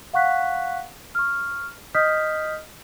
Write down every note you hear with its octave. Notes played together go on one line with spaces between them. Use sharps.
F5 F#5 C#6 F#6 B6
C#6 F6
D#5 D#6 F6 G6 B6